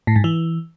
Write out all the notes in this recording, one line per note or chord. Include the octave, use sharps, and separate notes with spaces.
A2
G#2
E3